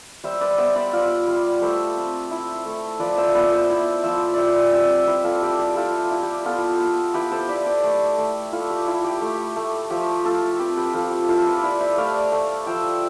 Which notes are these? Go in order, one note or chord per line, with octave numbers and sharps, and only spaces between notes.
G3 C5 E5
B4 D5
B3 C5 E5
B4 D5
F4
G3
A3 C5 E5
C4
E4
A3
F3 B4 D5
C5 E5
B3 B4 D5
C5 E5
E4
F3 C5 E5
G3 C5 D5 E5
C4 C5 E5
E4 G4 B4
F4 A4
G3 G4
G4
E4 F4 A4
E4
G4
B3 F4 A4
B3
E4 G4 B4
A4 C5
E4 B4 D5
G4 B4
A3
A3
E4 F4 A4
G4
E4
G4
A3
A3
F3 G4
A3 F4 A4
C4 G4 B4
G4 B4
F3 F4 A4
G4
E4 F4 A4
G4 B4
E4 B4 D5
C5 E5
A3 D5 F5
A3
F3 E5 G5